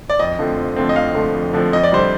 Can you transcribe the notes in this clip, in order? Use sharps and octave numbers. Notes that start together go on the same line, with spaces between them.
D5
F2 D#5
D3 F3 A3 C4
F2
D3 F3 A3 C4
D#5
F2 F5
D3 F3 A3 C4
F2
D3 F3 A3 C4
F2 D#5
D5
D3 G3 C5